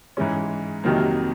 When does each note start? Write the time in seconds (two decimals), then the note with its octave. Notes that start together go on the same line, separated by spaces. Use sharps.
0.17 G#2 E3 G#3 C#4
0.84 F2 C3 D#3 F#3 A#3